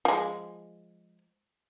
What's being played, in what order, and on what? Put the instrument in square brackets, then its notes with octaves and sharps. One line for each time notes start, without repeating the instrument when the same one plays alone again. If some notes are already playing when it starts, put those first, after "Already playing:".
[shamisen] F3 G#3